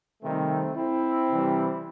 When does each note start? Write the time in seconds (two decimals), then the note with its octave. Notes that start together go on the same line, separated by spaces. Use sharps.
0.22 C3 D#3 G3 A3 C4
0.76 C4 E4
1.29 C3 E3 G3